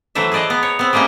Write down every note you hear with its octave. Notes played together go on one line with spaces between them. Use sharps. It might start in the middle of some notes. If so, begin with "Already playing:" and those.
E3 F#3 A3 C5 E5
G#4 B4 D5 D#5 A5
B3 A#5
C#5
B3 C4
G3 G#3 A#3 C#4 G4